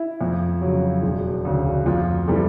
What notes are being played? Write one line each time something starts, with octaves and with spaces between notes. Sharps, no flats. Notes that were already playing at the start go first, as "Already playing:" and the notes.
Already playing: E4
F2
C#3 F#3
E1
D2 C#3
F2 F4
C3 E3 G3 A4